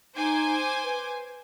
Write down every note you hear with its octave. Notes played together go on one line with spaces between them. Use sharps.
D#4 C5 G#5 D6
B4